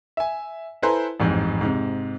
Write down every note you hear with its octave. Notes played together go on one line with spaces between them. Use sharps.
E5 G#5
E4 A4 B4 C5 G#5 A#5
A1 F2 G#2
G#2 C3